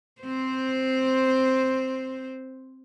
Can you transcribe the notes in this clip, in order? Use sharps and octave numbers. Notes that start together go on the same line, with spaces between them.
C4 C5